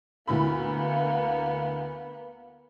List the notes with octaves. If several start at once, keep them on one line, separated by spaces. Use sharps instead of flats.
D2 A#3 B3 E4 B5